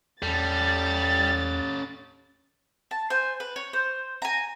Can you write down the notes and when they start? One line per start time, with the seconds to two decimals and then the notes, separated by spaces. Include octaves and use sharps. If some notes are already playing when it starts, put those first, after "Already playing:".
0.22 E2 G3 C#4 A4 A6
2.91 A5
3.10 C5 G#5
3.40 B4
3.56 C#5
3.73 C5
4.22 G#5 A#5